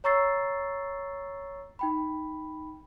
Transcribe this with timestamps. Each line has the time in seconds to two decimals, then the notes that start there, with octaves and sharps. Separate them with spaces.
0.04 C#5 A#5 C#6 E6 A6 C7
1.79 D#4 G5 B5